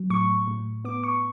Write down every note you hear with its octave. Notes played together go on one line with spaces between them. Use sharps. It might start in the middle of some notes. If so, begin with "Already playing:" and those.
Already playing: F#3
A2 C#6
A2
B3 D6
C#6